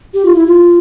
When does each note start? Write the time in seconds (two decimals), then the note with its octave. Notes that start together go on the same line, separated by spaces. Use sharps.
0.14 G4
0.25 F4
0.35 E4
0.47 F4